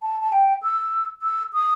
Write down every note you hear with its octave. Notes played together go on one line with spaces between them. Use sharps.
A5
A5
G5
E6
E6
D#6